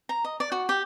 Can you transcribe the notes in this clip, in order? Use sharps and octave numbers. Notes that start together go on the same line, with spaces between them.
A#5
D#5
D5
F#4
G4